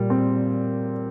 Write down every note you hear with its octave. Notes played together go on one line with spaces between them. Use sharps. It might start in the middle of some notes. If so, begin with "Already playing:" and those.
Already playing: A#2 G3
C4